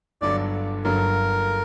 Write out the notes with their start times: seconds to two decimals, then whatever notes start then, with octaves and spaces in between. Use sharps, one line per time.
0.21 G1 G2 D3 F#3 D5
0.85 G1 G2 D3 F#3 A#4